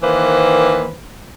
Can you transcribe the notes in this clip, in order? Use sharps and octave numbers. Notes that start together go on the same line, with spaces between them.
D#3 E3 A#3 B4 C5